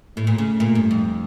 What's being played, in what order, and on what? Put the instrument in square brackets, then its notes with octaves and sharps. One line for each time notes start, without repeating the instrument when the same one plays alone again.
[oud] A2 [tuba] A3
[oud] A#2
C#3
A#2
G2
F2